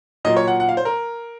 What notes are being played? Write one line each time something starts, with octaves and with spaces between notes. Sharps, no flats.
A#2 F#3 A#3 D#5
C#5
F#5
F#5
F5
C5
A#4